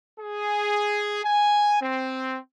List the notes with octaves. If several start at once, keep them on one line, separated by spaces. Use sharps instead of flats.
G#4
G#5
C4